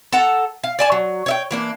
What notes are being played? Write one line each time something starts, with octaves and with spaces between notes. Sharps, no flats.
A4 F#5 A5 A#5
F5
D5 G#5 A5
F#3
C#5 E5 G5
E3 A#3 D4